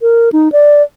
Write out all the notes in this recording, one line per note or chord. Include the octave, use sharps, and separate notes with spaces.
A#4
D#4
D5